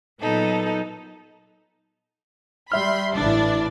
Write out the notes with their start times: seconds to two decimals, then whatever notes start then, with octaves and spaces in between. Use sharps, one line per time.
0.21 A#2 F#3 B3 D#4 A4
2.72 G3 E5 B5 C6 F6
3.16 A1 E3 D4 D5